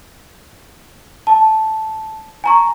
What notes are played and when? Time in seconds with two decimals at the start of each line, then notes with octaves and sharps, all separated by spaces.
1.27 A5
2.44 G#5 A#5 C#6